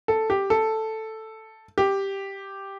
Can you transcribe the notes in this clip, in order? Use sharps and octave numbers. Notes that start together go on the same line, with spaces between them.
A4
G4
A4
G4